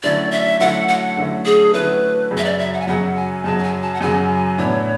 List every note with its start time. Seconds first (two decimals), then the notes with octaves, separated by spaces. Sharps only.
0.03 D3 F#3 A3 C#4 E4 D5
0.31 E5
0.60 D3 F#3 A3 C#4 E4 F#5
0.88 F#5
1.17 D3 F#3 A3 C#4 E4
1.46 G#4
1.73 D3 F#3 A3 C#4 E4 B4
2.31 F#2 C#3 F#3
2.37 E5
2.45 D5
2.59 E5
2.74 F#5
2.80 G#5
2.87 F#2 C#3 F#3 F#5
3.16 G#5
3.44 F#2 C#3 F#3 A5
3.59 A5
3.63 G#5
3.82 A5
3.94 F#5
4.01 F#2 C#3 F#3 G#5
4.58 A2 E3 B3 D4 C#5